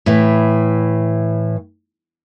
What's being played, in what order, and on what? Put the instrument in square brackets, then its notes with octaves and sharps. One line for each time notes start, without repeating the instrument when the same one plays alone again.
[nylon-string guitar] A2 E3